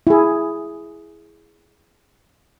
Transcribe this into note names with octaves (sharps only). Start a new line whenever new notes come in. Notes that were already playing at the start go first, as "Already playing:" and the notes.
E4 G#4